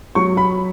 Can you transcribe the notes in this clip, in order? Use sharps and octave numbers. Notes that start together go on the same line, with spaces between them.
F#3 C#6
B5